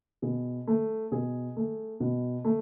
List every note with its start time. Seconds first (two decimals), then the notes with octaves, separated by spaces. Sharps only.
0.22 B2 G#4
0.67 A3
1.12 B2 G#4
1.56 A3
2.00 B2
2.45 A3